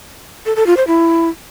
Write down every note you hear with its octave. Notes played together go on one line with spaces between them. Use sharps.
A4
A4
F4
C5
E4